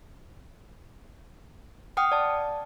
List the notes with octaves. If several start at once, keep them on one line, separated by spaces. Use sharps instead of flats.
F#5 G5 D#6 F6
D5 A5